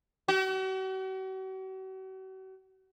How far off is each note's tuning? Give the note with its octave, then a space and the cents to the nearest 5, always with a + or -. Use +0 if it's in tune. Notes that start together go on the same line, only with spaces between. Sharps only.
F#4 +45